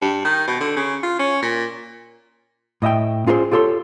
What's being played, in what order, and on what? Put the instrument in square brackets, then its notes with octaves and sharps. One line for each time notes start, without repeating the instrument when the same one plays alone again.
[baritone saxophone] G2
D#3
B2
D3
C#3
F4
C#4
A#2
[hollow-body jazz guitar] A2 D#5 E5 G5
C#4 F4 G#4 A#4 C5
F4 G4 A4 C#5 C6